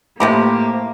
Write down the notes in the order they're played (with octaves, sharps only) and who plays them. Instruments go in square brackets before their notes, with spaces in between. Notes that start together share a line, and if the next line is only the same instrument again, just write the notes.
[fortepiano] A2 [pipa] C3 F3 B5 [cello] A#3 [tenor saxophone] G4